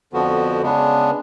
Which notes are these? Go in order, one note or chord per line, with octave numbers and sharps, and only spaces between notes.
F2 D3 F3 B3 F#4
C#3 G#3 B3 D4